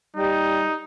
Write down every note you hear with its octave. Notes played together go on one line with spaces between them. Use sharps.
G3 D#4